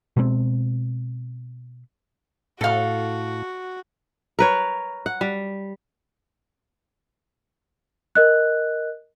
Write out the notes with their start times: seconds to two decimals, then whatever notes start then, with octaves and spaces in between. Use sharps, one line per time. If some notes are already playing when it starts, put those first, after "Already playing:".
0.17 B2 G#3 B3 C4
2.61 A2 F#4 A4 F5
4.39 A#4 B4 C#5
5.06 F#5
5.21 G3
8.15 A#4 D#5 F#6